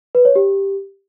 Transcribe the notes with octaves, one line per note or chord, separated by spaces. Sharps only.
B4
C#5
G4